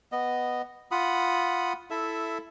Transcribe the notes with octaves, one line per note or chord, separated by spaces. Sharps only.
B3 D#5
F4 F#5 B5 D#6
E4 A4 E5 E6